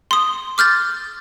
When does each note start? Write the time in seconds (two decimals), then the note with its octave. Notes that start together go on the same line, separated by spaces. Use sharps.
0.11 C6 D#6
0.58 D6 F6 G6 A6